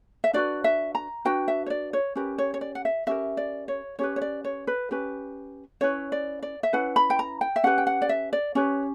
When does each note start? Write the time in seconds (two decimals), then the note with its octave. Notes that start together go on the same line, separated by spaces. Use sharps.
0.24 E5
0.33 D4 F#4 B4 D5
0.64 E5
0.95 A#5
1.25 D4 F#4 B4 G5
1.48 E5
1.66 C#5
1.70 D5
1.93 C#5
2.16 C#4 G4 A#4 B4
2.38 C#5
2.54 C#5
2.61 D5
2.75 F#5
2.85 E5
3.07 C#4 G4 A#4 E5
3.37 D5
3.68 C#5
3.99 C#4 G4 B4 C#5
4.16 C#5
4.22 D5
4.44 C#5
4.67 B4
4.91 C#4 G4 B4
5.81 C#4 E4 B4 C#5
6.12 D5
6.43 D5
6.63 E5
6.73 C#4 E4 B4 F#5
6.96 B5
7.10 G5
7.19 A#5
7.41 G5
7.56 E5
7.64 C#4 G4 B4 F#5
7.78 G5
7.87 F#5
8.02 D5
8.09 E5
8.33 D5
8.55 C#4 G4 B4 C#5